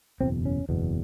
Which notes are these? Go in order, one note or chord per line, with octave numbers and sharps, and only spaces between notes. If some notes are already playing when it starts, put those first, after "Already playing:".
F#1 E2 B2 C4
C#4
F#1 E2 B2